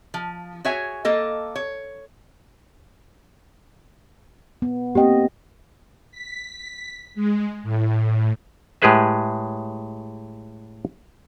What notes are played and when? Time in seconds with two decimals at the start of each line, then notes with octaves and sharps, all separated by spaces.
0.14 F3
0.65 F#4 G#4 C#5 E5 G#5
1.05 A#3 A4 D#5
1.56 C#5
4.62 B3
4.95 A#3 C4 G4 D#5 G5
6.11 B6
7.15 G#3
7.63 A2
8.82 A2 G#3 G4 G#4 B4 E5